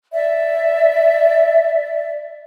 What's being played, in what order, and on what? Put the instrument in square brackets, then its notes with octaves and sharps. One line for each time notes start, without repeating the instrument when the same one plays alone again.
[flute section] D5 E5